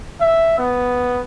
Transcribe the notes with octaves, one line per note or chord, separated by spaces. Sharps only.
E5
B3